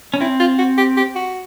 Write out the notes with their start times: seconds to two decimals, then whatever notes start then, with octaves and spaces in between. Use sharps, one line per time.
0.14 C#4
0.21 C4 E4
0.40 F4
0.58 F#4
0.78 G4
0.97 G4
1.15 F#4